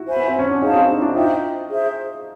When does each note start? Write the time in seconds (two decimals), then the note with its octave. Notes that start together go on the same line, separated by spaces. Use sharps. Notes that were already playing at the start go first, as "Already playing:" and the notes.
Already playing: E4 F#4
0.08 C5 E5 G#5 B5
0.16 B3
0.28 C4
0.39 C#4
0.51 D4
0.61 C#4 D#4 G#4 C5 F5 A5
0.75 C4 D4
0.88 C#4 D#4
1.02 D4 E4
1.15 D#4 F4 C5 E5 G5
1.69 G#4 C5 E5